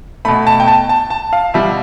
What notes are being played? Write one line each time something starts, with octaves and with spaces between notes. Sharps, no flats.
B2 A3 B5
A5
G5
A5
A5
A5
F5
B2 G3 E5